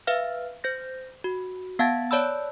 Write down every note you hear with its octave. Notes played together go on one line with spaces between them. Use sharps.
B4 E5 F5 F6
C5 G6 A#6
F#4
B3 F5 F#5 A5 G#6 A6
C#5 D5 A5 B5 E6